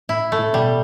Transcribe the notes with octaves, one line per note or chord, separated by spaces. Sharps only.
A2 E4
A3
A2
B2 G3